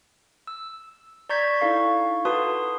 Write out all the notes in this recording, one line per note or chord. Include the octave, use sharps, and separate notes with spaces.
E6
D5 A#5 C#6 G6 G#6 B6
D#4 E4 A4 F5 C#6
F#4 A4 B4 A5 C6 D#6